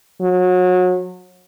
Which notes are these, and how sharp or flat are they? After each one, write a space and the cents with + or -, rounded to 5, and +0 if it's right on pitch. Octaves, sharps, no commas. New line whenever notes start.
F#3 -30